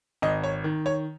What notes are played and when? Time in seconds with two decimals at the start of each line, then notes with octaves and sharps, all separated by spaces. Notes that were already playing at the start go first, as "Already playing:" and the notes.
0.22 G#1 D#5
0.44 C#5
0.64 D#3
0.86 C#5